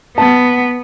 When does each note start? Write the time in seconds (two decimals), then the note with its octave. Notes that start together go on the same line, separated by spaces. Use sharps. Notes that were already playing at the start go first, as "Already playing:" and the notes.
0.18 B3 A5